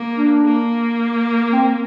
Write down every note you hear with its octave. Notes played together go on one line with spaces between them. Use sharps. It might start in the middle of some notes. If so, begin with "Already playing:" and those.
Already playing: A#3
D4
A#3
C4